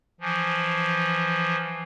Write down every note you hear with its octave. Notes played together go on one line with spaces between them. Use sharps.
E3 F3